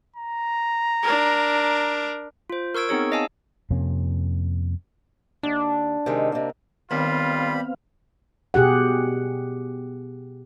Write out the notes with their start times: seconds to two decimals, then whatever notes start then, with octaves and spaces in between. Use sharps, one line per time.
0.16 A#5
1.03 D4 A#4
2.50 F4 C5
2.75 A#4 C#6 E6 G#6 D7
2.89 B3 C4 D#4 G#4 C#5
3.12 D#5 F5 G#5 A5 E6
3.71 F2 C3 A#3 C#4
5.43 D#2 D4
6.06 C3 D#3 G#3
6.32 C3 A#3
6.91 D#2 G3 B3 C4 F4 F5 B5
8.54 B2 G4 G#4 F#5